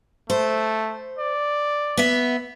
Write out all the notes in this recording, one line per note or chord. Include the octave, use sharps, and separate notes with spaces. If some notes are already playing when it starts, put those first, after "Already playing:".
A3 C5
D5
B3 E5